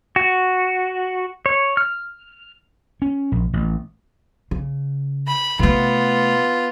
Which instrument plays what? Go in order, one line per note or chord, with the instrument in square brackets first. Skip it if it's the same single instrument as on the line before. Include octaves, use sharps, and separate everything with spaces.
[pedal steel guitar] F#4
C#5
F6
[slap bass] C#4
A#1
A1
[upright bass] C#3
[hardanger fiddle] B5
[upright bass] C3 A3 [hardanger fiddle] B3 F4